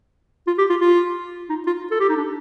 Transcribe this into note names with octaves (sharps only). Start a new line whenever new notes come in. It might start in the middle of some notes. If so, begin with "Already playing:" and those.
F4
G4
F4
F4
D#4
F4
A4
G4
D#4
D4